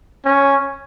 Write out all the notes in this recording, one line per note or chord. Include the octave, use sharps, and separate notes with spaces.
C#4